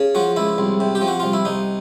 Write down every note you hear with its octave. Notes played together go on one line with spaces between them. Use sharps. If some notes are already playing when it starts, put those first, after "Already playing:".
Already playing: C#3
F3 F#4
C#2 E4
C2
C3
G4
F3
F#4
C2 F4
E4
C2 D#4